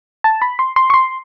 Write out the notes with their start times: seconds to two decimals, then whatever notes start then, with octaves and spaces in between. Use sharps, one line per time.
0.24 A5
0.42 B5
0.59 C6
0.76 C6
0.90 C#6
0.94 C6